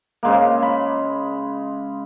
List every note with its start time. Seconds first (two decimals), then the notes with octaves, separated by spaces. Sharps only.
0.23 C#3 G#3 A#3
0.62 B5